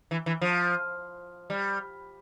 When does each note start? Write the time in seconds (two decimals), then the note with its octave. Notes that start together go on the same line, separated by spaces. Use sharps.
0.11 E3
0.26 E3
0.41 F3
1.50 G3